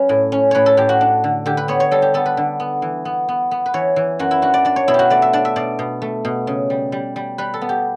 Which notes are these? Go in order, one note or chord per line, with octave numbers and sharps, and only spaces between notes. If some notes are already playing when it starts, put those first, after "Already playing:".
Already playing: F#3 C#4 B4 C#5
A2
C#4
A2 B4 C#5
A4
A2 G4
F#4
D4
D3
D3 G4
B4
B3 C#5
C#5
G3 A4
G4
B3 A4
B4
D3
B3
E3
B3
B3
B3
B4
E3 C#5
E3
F#2 F#4
E4
D4 F#4
D5
D4 D5
C#5
B2 E4
F#4 G4
A3 D5
E5
D4 D5
E5
B2 D5
B2
A3
B2
C#3
G3
G3
G3
G3 B4
A4
B3
G4